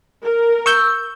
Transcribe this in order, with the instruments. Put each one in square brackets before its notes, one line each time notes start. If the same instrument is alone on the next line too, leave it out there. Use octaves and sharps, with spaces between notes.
[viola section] A#4
[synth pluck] C#6 E6 G6